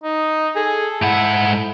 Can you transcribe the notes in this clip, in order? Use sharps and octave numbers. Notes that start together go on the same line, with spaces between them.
D#4
G#4 A4
G#2 E4 F#5